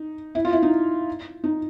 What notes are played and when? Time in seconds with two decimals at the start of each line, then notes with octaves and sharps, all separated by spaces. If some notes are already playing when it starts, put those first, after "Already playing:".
Already playing: D#4
0.35 E4
0.45 F4
0.53 E4
0.62 D#4
1.44 D#4